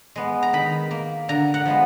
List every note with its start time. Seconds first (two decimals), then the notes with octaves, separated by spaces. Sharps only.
0.16 G#3 B3
0.43 A#5
0.53 D#3 B5
0.91 A#3
1.28 D3 A#5
1.54 F#5
1.65 F3 G#3 B3